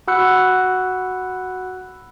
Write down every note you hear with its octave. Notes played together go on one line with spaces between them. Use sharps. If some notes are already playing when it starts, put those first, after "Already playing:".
F#4 F#5 B5 E6 F#6 C#7